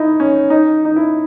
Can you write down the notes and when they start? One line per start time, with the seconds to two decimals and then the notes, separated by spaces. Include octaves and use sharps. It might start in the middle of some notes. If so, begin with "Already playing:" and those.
Already playing: D#4 E4
0.20 C#4
0.50 D#4
0.85 D#4
0.96 E4